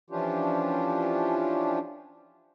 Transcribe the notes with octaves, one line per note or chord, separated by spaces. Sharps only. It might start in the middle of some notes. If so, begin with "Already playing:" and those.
E3 F3 C#4 D4 F4 G4